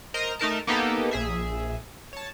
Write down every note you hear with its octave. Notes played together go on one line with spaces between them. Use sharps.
A#4 C5 D#5 A#5
A3 D#4 A#4 A5
A#3 B3 D#4 G4 A4
A#1 G#4 E5
C#5 A5